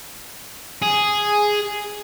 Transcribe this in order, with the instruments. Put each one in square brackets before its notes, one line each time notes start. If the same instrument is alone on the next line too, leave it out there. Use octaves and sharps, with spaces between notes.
[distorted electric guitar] G#4